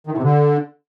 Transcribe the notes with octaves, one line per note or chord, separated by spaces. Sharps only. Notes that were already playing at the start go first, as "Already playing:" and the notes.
D#3
A2
C3
D3